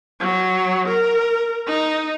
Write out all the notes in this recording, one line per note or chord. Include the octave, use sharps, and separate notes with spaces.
F#3
A#4
D#4